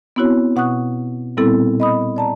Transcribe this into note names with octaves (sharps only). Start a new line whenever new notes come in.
B3 C4 E4 F#4 C#5
B2 F#5 C#6 D#6 F#6
A#2 G3 B3 C4 E4 A4
D#5 B5 D#6
D5 A5 A#5